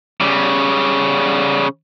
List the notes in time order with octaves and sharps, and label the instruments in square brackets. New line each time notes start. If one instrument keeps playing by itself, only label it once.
[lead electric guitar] C#3 G3